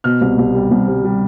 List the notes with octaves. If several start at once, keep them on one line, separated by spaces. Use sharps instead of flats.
B2 F6
C2
C2
G3
C2
G3
G3